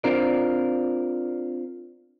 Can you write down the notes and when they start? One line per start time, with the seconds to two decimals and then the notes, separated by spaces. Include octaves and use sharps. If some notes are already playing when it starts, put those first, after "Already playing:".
0.04 C4 D4 F4 A#4 C5 D5